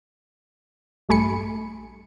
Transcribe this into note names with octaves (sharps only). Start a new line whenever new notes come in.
A#1 G2 A3 G#5 B5 C#7